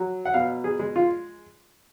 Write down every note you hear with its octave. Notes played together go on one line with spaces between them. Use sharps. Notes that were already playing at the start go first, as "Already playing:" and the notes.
Already playing: F#3
F#5
B2 F5
G#4
G#3
F4